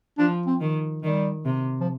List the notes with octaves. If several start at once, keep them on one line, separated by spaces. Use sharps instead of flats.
F3 D4
C4
D#3
D#3 G3
C3
F3